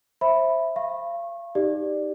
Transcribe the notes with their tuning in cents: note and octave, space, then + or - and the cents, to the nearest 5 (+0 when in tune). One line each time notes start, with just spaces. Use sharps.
C5 +20 E5 +0 B5 +0
F5 -35 C#6 -25
D#4 +0 G4 +0 D5 +15